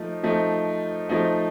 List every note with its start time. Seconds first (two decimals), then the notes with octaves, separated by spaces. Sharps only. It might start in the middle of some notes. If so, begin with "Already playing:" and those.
Already playing: F3 A3 D#4
0.23 F3 A3 D#4
1.09 F3 A3 D#4